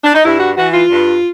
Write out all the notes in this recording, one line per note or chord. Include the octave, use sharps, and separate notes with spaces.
D4
D#4
G2 E4
F#4
E3 F#4
F4
G2